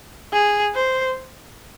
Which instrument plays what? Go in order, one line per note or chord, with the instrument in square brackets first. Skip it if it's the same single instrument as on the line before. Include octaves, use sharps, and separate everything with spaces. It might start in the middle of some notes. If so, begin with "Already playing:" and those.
[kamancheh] G#4
C5